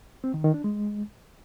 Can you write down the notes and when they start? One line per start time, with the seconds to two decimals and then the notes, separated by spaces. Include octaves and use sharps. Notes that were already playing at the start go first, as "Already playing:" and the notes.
0.24 C4
0.34 D#3
0.44 D#3
0.54 D4
0.64 G#3